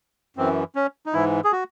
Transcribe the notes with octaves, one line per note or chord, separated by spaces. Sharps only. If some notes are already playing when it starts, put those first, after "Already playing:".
F#2 E3 C4
C#4
D#4
G#2 E3 E4
G#4
F#4